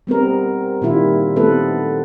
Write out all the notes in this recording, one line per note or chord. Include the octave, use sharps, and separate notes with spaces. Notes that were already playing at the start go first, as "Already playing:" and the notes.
G3 B3 C4 A#4
A#2 D#3 G3 E4 F4
A3 B3 C4 E4 A4 B4